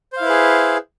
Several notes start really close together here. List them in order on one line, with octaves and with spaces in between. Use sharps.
C5 F5 E4 B4 G#4